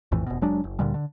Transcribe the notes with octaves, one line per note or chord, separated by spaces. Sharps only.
A#1 F2 A2 E3
F1 B2
F1 F#3 G#3 D4
F#1
D2 A#2 D3 G3
D3